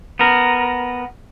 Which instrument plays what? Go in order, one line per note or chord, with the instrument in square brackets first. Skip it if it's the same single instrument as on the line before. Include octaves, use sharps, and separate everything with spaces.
[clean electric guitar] B3 A#4